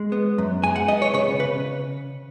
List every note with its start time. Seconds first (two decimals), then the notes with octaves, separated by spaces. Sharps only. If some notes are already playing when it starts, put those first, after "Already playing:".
Already playing: G#3
0.12 B3
0.38 F#2
0.63 G#3 G#5
0.76 F#5
0.88 B3 D#5
1.02 C#5
1.14 C#3 C#5
1.39 C#3 B4